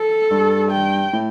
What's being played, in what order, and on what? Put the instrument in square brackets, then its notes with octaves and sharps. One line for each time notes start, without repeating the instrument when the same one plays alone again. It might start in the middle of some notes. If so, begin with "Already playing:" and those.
Already playing: [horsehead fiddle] A4
[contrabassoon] G2
[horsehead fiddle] G5
[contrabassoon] A2